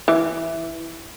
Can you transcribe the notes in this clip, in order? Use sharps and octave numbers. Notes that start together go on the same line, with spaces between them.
E3